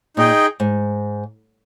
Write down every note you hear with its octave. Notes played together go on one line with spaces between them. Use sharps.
A#2 D#4 G#4 D#5 G5
G#2